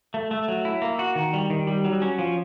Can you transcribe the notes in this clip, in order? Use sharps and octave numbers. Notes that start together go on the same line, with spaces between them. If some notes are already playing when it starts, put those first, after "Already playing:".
A3
A3
F#3
E4
A#3
F#4
D#3
G3
D#3
G3
F#3
C#4
F3